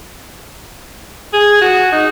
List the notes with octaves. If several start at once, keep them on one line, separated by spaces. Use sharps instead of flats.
G#4
F#4
D#4